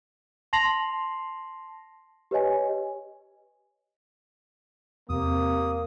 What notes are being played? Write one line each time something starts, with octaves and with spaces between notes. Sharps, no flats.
A5 C6 A#6 C7 F7 F#7
G4 B4 C#5 D#5 G#5
E2 C3 A#3 D#6